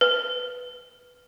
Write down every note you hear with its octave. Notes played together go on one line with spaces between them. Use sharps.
B4